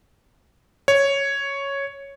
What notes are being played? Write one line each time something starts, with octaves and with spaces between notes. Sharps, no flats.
C#5